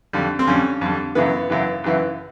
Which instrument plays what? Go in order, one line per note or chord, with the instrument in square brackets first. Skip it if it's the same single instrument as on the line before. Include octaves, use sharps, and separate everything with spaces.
[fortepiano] F2 D3 G3
C4
F2 D3 G3 C#4
F2 D3 G3
F#2 C#3 E3 B3
F#2 C#3 E3
F#2 C#3 E3